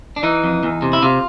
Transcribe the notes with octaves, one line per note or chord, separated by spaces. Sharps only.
D4
E3 D#4
F2
E2
C3
E4
C3 F4